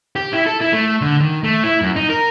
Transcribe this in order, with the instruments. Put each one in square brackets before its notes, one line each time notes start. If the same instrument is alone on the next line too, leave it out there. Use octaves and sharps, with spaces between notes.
[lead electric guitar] G4
E4
A4
E4
A3
D3
D#3
A3
E4
F#2
D#4
A#4